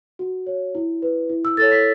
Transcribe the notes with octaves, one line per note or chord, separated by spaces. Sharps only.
F#4
C#5
E4
B4
E4
E6
A4 C#5 A6
B6